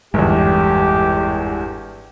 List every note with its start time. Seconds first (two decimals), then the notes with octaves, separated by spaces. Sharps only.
0.14 G1 E2 G#2 G4